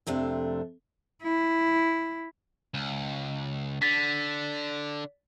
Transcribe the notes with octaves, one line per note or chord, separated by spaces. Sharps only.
F2 C3 A3 D4
E4
C#2
D3 A6 B6